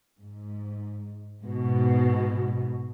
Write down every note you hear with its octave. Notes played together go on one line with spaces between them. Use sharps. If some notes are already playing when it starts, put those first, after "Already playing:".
G#2
G#2 B2